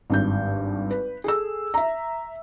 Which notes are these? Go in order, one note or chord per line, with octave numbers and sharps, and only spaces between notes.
G#1 G2 G6
B4
G#4 A4 E6
E5 A#5